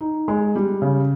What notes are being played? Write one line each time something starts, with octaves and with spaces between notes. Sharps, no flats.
D#4
G#3
G3
C#3